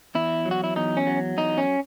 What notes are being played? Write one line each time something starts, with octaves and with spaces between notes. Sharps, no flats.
E2 E4
F#3
F#4
E4
E2 D#4
C#4
F#3
E2 D#4
C#4